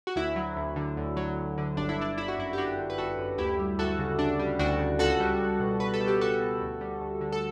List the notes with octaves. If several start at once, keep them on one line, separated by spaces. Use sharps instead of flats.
F#4
D2 E4
F#3
D2
D3
D2
F#3
D2
D3
G1 D4
E4
D3 D4
G1 E4
F#4
F#2 E4
G4
G1 D4 F#4
D3
B4
G1 F#4 A4
F#2
D2 E4 G4
G3
D2 F#4 A4
C#3
D2 D4
G3
D2 D4 F#4
C#3
C#2 F#4 A4
G3
C#2
B2
C#2 B4
A4
G3
G4
C#2 F#4 A4
B2
D2
G3
D2
D3
A4